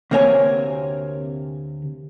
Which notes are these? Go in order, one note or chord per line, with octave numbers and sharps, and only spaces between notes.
D2 C3 A#3 C4 C#5 G#5